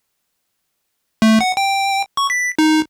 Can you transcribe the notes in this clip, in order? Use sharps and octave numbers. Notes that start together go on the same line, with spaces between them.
A3
F#5
G5
C#6
B6
D#4